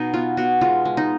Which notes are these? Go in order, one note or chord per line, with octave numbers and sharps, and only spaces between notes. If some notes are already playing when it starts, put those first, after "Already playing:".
Already playing: B2 D#4
B3 F4
B2 F#4
G#3 F4
G#3
D#4